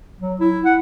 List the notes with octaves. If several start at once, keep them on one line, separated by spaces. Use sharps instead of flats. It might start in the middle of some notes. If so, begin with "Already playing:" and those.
F#3
E4
F#5